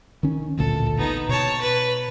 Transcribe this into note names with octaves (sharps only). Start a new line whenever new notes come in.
D#3 C#4
A1 D2 A#2 A4
B3 D#4
B2 C#5 A5
B4